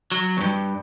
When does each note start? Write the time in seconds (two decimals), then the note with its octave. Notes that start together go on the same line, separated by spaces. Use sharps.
0.12 F#3
0.37 E2 G2